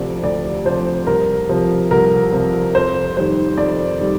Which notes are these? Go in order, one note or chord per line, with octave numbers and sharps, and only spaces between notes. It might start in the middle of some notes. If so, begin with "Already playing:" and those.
Already playing: D2 C3 F3 D5
D2 D5
C3 F3 C5
C2 A#4
C3 F3
C2 A#4
C3 F3
F2 C5
D#3 G3 C5
F2 D5
D#3 G3